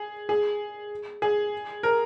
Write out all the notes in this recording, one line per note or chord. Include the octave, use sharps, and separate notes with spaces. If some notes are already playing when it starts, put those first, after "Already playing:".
Already playing: G#4
G#4
G#4
A#4